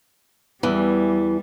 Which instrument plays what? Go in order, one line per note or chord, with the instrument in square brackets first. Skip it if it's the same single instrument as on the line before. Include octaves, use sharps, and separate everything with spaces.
[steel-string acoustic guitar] E2 E3 [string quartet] G3